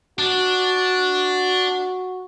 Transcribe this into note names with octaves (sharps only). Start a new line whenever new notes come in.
D4 F#4